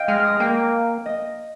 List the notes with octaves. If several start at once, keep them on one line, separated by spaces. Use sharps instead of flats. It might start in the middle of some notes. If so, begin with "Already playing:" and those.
Already playing: D#5 F5 G5
G#3 F6
D#6 F6
A#3 G5
D#5